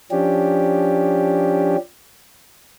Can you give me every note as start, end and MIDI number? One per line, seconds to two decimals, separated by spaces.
0.11 1.77 53
0.11 1.77 61
0.11 1.77 62
0.11 1.77 67